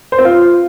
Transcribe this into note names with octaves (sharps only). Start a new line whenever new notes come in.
C5
C4
F4